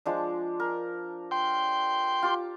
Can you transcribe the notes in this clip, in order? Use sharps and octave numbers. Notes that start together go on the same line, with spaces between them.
F3 G#3 D4
A#4
G5 C6
F4 G4